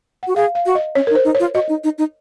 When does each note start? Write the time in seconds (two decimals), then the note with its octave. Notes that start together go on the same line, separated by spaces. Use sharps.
0.23 F#4 F#5
0.36 G#4 F5
0.55 F5
0.66 F#4
0.75 D#5
0.95 C#4 C#5
1.07 A#4
1.10 D#4
1.15 C5
1.25 D#4
1.35 C#5
1.40 F4
1.54 F#4 D#5
1.69 D#4
1.84 D#4
1.98 D#4